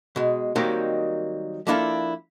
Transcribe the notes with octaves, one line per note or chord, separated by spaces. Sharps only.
B2 G#3
D#3 F#3 G3 A#3 C4 D#4
F3 A#3 D4 E4 F4 A4